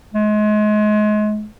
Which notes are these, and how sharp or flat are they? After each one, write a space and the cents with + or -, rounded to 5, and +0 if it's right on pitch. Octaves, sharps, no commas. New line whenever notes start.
G#3 +30